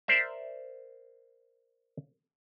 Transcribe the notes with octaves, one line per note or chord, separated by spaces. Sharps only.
A#4 C5 D5 E5